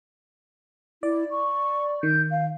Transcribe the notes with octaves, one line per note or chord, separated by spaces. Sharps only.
E4 D5
C#6
D#3 G6
F5